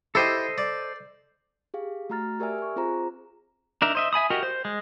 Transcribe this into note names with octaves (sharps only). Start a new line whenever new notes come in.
E4 G4 A4 C5 D#5
D5
G4 G#4 F5
A3 F#4 A#5 F6 A6
G4 A#4 D5 E5 G#5 F6
G#5 C#6
C4 F4 G#4 C5 A#5
D4 D#4 A#4 E5
C5 D#5 E5
E5 G#5 B5 D#6
F#4 G4 A#4 D#5
C5
G#3